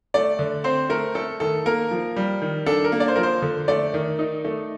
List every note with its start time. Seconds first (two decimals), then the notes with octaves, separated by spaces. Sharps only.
0.14 A3 D5
0.39 D3
0.64 C4 C5
0.89 A3 A#4
1.15 A3 A4
1.40 D#3 A4
1.66 A#3 A#4
1.91 F3
2.16 G3
2.42 D#3
2.66 D4 A4
2.84 A#4
2.92 A#3
3.00 D5
3.08 C5
3.16 F3 A#4
3.23 C5
3.42 D3
3.68 A3 D5
3.94 D#3
4.19 D#4
4.45 A3